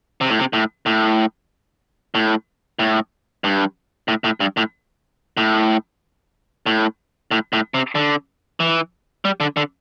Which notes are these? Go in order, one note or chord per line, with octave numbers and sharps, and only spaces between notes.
C3
A2
C3
A2
A2
A2
A2
G2
A2
A2
G2
A2
A2
A2
A2
A2
C3
D3
E3
G3
D3
D3